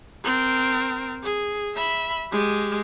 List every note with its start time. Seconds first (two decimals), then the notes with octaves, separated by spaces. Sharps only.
0.24 C4 A#4
1.23 G#4
1.75 E5 B5
2.32 G#3 G4